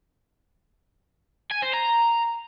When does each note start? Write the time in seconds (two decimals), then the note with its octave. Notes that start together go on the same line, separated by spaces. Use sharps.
1.52 G#5
1.63 C5
1.73 A#5